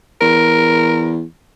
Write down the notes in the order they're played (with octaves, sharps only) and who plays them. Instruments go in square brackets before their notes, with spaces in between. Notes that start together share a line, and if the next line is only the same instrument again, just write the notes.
[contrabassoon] E2 [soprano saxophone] A#4